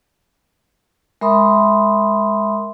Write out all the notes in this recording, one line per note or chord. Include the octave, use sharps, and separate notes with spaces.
G#3 A#4 E5 B5 C6 D#6